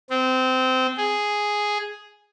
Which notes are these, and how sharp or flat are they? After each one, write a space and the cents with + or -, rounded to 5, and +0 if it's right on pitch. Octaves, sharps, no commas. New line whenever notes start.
C4 -20
G#4 +0